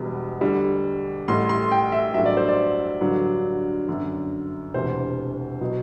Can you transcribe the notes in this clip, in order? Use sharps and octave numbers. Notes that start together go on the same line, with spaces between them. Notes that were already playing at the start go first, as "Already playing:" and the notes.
Already playing: E1 E2 B2 G3
D2 D3 G3
A1 A2 G3 C6
C6
G5
E5
A1 G2 F#3 E5
D5
C5
D5
A1 G2 D3 F#3
G1 F#2 D3
E1 D2 C3 E3 C5
B2 F#3